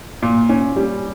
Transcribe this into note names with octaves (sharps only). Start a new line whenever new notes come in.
A#2
C#4
G3